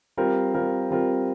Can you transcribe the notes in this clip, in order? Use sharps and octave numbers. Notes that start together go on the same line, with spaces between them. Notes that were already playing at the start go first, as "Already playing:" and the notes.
G3 C4 F4 A#4
G3 C4 F4 A#4
G3 C4 F4 A#4